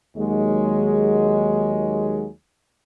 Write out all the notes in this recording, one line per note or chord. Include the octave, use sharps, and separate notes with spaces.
D#2 F#3 G#3